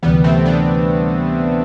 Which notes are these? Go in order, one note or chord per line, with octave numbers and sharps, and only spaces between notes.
D2 C3 E3 G3 B3
A3 C4
B3 D4